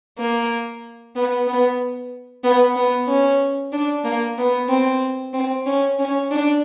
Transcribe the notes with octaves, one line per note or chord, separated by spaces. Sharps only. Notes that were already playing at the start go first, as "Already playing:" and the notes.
A#3
B3
B3
B3
B3
C#4
D4
A#3
B3
C4
C4
C#4
C#4
D4